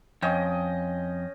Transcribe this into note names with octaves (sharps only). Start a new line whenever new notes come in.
F2 C#4 D#5 G5